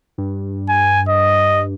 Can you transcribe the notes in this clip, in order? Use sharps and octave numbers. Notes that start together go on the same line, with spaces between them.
G2
G#5
D#5